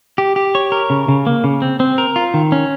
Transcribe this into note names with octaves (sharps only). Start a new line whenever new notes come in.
G4
G4
C#5
A#4
C#3
C#3
A#3
C#3
C4
C4
A#4
F4
D#3
C#4